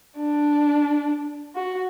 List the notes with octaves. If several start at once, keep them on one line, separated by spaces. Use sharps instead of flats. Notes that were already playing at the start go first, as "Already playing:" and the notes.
D4
F#4